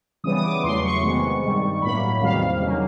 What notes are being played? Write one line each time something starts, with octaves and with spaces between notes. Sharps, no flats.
C#3 E3 G3 B3 D#6
D#6
D6
D6
E2 C#3 F#3 A3 C6
C#6
C3 D#3 G#3 B3 C#6
G2 D#3 G3
A2 F#3 A#3 B5
E2 C3 D#3 G3 F5
C#3 F#3 A#3